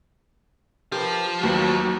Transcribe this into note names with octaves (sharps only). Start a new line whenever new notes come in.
F3 G4 A#4 B4
D#2 F#3 G4 B4